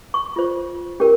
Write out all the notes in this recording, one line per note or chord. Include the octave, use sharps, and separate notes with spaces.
C#6
F4 C5
C#4 G4 A#4